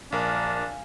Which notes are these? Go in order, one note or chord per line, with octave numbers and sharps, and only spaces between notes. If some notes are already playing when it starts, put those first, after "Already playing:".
A#1 D4 A#4 F5 G#5 F6